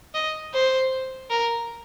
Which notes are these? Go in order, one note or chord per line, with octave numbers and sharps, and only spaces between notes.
D#5
C5
A#4